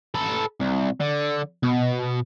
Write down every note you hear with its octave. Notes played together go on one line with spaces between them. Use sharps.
A4 B4
C2
D3
B2